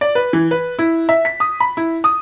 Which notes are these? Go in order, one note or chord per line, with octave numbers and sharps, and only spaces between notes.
D5
B4
E3
B4
E4
E5
B6
D#6
B5
E4
D#6